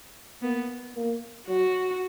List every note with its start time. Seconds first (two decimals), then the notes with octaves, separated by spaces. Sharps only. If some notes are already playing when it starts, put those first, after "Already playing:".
0.43 A#3 B3
0.96 A#3
1.47 F#3 F#4